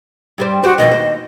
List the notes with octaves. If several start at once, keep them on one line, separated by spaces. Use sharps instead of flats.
G2 G3 C5
F#4 G4 C5
F2 B2 D#3 D#5
D#2 C5